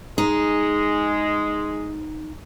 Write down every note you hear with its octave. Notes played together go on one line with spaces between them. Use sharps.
G#3 D#4